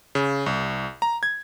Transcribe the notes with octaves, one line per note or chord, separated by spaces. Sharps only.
C#3
C2
A#5
G#6